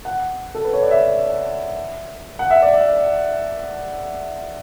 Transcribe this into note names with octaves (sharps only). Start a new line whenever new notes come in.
F#5
A4
B4
C#5
D5
E5
F#5
E5
D5